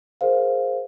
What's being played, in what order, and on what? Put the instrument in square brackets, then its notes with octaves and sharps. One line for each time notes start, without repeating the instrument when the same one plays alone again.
[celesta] G#4 A#4 C5 F5